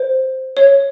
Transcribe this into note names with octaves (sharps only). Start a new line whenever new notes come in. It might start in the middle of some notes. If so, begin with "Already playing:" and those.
Already playing: C5
C#5